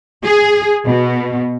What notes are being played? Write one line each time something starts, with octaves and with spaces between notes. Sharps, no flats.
G#4
B2